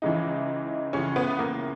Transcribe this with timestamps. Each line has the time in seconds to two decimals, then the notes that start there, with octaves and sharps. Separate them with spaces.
0.02 C#2 C#3 E3 D#4
0.93 C#2 C#3 E3 C#4
1.16 B3
1.39 A#3